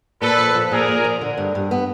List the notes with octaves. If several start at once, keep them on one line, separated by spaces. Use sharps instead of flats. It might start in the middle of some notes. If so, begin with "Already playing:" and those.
A#2 A4 B4
F3
F3
A#2 G#4 A#4
A#2
F3
D3
G2
G2
B3